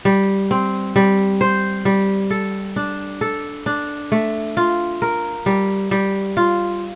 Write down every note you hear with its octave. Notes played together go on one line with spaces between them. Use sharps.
G3
C4
G3
C5
G3
A4
D4
A4
D4
A3
F4
A#4
G3
G3
F4